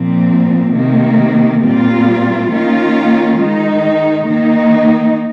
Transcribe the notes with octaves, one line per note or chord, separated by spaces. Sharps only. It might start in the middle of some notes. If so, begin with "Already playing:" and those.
Already playing: A#2 F3 C4
C3 D#3 A#3
A#2 G3 C4 F4
D#3 A#3 C#4 F4
D#3 G#3 D#4
D#3 A#3 D#4